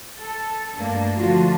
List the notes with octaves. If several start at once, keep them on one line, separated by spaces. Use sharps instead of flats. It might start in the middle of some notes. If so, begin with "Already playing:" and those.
A4
G2 A3 A#3 D4
D3 F3 A3 D4 F4 F#4